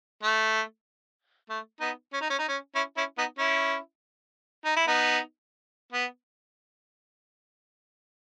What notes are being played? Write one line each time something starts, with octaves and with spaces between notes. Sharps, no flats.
A3
A3
B3 D#4
C#4
D#4
C#4
D#4
C#4
C#4 E4
C#4 E4
B3 D#4
C#4 E4
D#4
E4
B3 D#4
B3